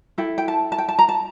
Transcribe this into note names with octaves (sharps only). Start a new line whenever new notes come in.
E4 A4 G5
G5
A5
A5
G5
A5
A#5
A5